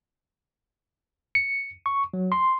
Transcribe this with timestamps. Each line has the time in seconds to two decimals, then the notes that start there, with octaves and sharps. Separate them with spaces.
1.35 C#7
1.86 C#6
2.14 F#3
2.32 C6